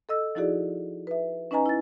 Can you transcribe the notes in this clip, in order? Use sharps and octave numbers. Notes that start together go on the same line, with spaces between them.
A4 D#5 E6
F3 D#4 E4 F#4 G#4 D5
B4 E5
C#4 D#4 B4 D#5 G#5 A#5
E4 A6